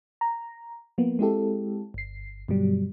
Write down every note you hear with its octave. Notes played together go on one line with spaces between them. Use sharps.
A#5
F3 A#3 B3
G#3 C4 E4 G4 A4
G1 C7
G2 B2 D3 F#3 G3